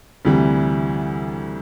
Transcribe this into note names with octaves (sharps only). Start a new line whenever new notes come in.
D2 C3 E3 G3